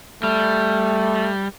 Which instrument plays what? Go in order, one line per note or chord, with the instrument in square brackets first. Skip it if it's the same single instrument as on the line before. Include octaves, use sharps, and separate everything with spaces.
[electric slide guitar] G3 [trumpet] A3